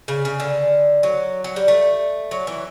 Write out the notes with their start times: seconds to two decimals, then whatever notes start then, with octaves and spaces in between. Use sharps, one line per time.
0.08 C#3
0.25 C#3
0.40 D3
1.03 F#3
1.44 F#3
1.56 G3
1.68 A3
2.31 F#3
2.47 E3